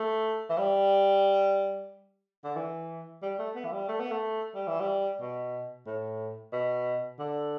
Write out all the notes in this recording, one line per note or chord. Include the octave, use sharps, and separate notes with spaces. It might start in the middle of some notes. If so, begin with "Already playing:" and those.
Already playing: A3
E3
G3
D3
E3
G3
A3
B3
E3
G3
A3
B3
A3
G3
E3
G3
B2
A2
B2
D3